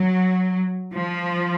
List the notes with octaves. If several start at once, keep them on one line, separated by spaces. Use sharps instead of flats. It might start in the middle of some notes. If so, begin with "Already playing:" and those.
Already playing: F#3
F3